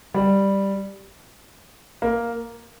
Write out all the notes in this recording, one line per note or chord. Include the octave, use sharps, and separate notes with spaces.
G3
A#3